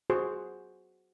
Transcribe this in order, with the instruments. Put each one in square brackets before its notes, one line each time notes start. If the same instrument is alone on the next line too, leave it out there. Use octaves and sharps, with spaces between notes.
[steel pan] F#4 G#4 C5